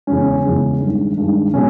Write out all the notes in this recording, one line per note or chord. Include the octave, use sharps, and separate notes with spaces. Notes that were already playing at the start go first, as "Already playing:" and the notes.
E2 C#3 G#3 C#4
E2 C#3 G#3
G2 D#3 G#3
G2 D#3 G#3
B2 G#3 C#4